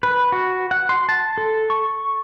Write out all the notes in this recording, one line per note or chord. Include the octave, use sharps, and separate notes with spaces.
B4
F#4
F#5
C6
A5
A4
C#6